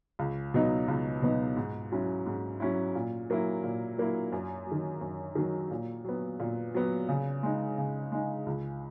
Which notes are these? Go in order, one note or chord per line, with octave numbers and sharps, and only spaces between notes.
C#2
B2 F#3 B3 D#4
C#2
B2 F#3 B3 D#4
G#2
F#3 C#4 E4
G#2
F#3 C#4 E4
A#2
F#3 A#3 E4
A#2
F#3 A#3 E4
F#2
F#3
D#3
F#2
D#3 F#3
A#2
F#3 B3
A#2
F#3 B3
C#3
G#3 D#4
C#3
G#3 D#4
C#2